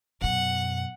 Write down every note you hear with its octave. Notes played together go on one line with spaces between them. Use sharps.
F#2 B2 F#5